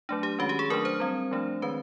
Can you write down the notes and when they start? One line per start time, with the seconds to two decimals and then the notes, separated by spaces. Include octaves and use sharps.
0.09 F#3 A3 D4
0.23 G4
0.39 D#3 G#3 C#4 F#4
0.49 G4
0.59 G#4
0.70 F#3 A3 D4 A#4
0.85 C5
1.00 G3 C4
1.31 F3 A3 D4
1.62 D#3 G#3 C4 B4